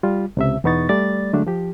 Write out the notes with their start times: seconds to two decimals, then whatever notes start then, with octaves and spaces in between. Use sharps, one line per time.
0.03 G3 F4
0.37 C#2 C3 E5
0.64 E2 B2 B3 D#4 C#6 A6
0.89 G3 A3 D5 A6
1.33 D3 F#3 G#3 A3 D4
1.47 F3 G4